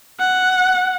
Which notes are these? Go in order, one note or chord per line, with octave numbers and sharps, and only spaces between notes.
F#5